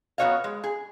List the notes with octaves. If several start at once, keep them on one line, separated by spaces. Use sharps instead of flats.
F#3 B3 F#4 C#5 D#5 F5
G#3
G#4